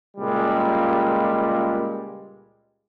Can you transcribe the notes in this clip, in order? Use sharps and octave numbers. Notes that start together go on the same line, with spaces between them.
C#2 A#2 G3 G#3